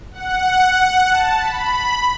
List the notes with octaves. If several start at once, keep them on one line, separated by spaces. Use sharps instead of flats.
F#5
A5
B5